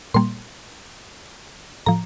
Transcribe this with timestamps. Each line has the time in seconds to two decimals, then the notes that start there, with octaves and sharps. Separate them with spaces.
0.14 A#2 G3 A#3 C6
1.86 A2 F3 A#5